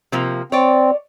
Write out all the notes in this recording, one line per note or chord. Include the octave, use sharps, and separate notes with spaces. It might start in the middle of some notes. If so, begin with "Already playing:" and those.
C3 F3 A#3
C4 C#5 D5